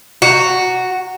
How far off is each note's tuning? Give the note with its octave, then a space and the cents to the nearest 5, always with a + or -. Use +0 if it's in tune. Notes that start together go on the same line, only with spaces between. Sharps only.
F#4 +0 A#5 -10